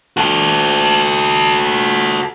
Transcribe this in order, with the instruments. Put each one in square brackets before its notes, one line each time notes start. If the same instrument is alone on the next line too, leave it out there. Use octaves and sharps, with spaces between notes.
[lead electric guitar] F#4 A4